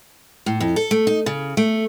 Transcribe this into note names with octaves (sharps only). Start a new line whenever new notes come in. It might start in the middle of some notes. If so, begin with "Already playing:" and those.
A2
F2
A4
A3
D#4
C#3
A3